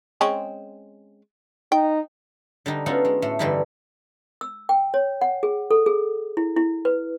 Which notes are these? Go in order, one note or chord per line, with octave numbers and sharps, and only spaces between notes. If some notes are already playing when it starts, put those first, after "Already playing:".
G#3 C4 C#4
D#4 G5
D3 G3 D#4
B3 C#4 D#4 F4 F#4 A4
G#3
A2 A3
G2 D3 E3 G3 D#4 E4
E6
G5
C#5
F#5
G#4
A4
G#4
E4
E4
B4